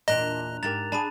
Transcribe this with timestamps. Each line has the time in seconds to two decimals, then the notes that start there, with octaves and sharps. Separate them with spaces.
0.08 E2 A#2 D4 D#5 A#5 F#6 F7
0.63 G#2 G4 A#4 A#5 A6 F7
0.92 D4 G#4 A5 B5 D#7